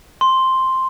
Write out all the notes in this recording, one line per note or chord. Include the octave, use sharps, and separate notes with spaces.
C6